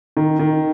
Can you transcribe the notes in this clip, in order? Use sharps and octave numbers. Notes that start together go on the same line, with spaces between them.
D#3
D#3